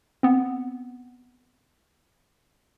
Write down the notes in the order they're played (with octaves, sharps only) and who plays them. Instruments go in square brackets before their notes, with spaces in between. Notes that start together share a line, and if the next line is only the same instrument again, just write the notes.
[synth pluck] B3 C4